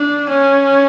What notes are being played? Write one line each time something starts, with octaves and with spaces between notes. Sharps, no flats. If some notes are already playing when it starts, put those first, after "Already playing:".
Already playing: D4
C#4